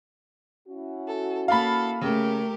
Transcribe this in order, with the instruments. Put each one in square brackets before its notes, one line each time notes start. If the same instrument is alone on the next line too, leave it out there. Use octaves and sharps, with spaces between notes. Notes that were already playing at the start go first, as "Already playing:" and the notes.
[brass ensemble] C#4 E4 F#4
[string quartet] A4
[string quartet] A#3 A4 A6 [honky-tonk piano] F5 B5
[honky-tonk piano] C#3 [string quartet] A3 G4 A#4